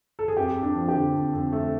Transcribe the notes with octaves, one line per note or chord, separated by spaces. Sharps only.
A4
G#4
F2 G4
F2
D4
F3
G4
D3
F2
F2
A3